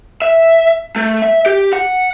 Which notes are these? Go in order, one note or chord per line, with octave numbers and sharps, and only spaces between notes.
E5
A3
E5
G4
F#5